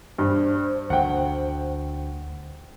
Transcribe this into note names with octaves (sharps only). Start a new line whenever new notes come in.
G2 C5
D2 F#5 G5